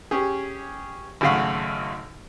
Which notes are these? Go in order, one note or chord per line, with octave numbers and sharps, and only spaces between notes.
C#4 G4 G#4
G#1 F#2 C#3 A3 F5 F#5